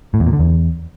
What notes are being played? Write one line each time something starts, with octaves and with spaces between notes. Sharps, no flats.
A2
E2
A#2
D3
E2